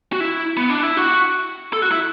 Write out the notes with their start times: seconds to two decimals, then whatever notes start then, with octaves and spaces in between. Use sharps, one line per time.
0.13 F#4
0.20 E4
0.57 B3
0.70 D4
0.83 E4
0.97 F#4
1.73 A4
1.82 F#4
1.92 E4